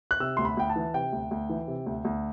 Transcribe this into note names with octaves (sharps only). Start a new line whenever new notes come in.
F#6
C3 E6
D2 C6
B5
D2 G5
A5
E3
C3 G5
D2
D2
E3
C3
D2
D2